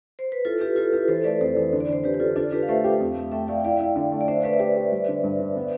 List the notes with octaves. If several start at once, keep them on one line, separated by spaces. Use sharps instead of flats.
C5
B4
E4 F4 A4
E4 G4 B4
E4 F4 A4
E4 G4 B4
E3 A4 C5
A3 B4 D5
F2 A4 C5
E3
D3
D5
D3 C5
D3 G4 B4
G4
D3 F4 A4
D4 F4 A4
D4 G4 B4
F5
A3 C5 E5
G4
F2
A3
A3 E5 G5
A3 D5 F5
G5
E4 D5 F5
E4
D3
A3
D5
D4 C5 E5
A3 B4 D5
E5
G4 B4 D5
G4
G3
D3
G2
D3
B3